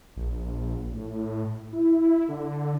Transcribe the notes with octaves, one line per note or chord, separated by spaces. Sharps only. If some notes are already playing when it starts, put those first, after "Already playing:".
A#1
A2
E4
D3